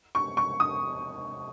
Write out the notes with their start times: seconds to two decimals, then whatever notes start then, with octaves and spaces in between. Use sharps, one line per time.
0.15 C#6
0.37 C#6
0.60 D#6